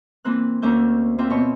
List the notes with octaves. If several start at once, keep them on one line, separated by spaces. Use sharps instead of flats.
E3 A#3 C4 F#6
D2 A#3 C#4 E5 G6
A#3 C4 F4 E5 G5
B2 C4 C#5 C#6